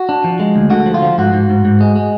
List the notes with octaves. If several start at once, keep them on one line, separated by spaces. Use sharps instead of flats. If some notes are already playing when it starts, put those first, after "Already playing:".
Already playing: F#4
D4
F3
G#3
D2
D3 F#4
F3
F4
F3
G#2 F#4
G#2
G#2
G#2
G#3
G#3